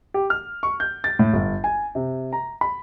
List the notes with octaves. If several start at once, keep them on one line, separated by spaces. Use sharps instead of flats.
G4
F6
C#6
G6
A6
A2
G1
G#5
C3
A#5
B5